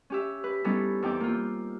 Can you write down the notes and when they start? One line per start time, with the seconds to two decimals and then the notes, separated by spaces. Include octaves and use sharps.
0.10 C#4 G4 E5
0.44 B4
0.64 G3 B3 C#4 D#4 E4 A4
1.02 E2 C4 D#4 E4 G5 D6
1.20 A#3 F4